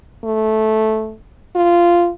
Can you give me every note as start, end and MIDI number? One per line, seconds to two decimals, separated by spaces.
0.24 1.14 57
1.55 2.09 65